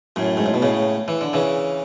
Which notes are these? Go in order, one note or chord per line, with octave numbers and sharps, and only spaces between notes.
F#2 A2
G#2
A2
B2
A2 C#3
E3
D3
C#3 E3